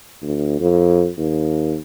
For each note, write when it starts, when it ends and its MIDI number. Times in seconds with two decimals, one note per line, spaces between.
0.22 0.57 38
0.60 1.09 41
1.18 1.77 39